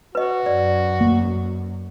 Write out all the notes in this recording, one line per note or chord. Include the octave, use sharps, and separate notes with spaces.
F#4 B4 D#5
F#2 D5
A#3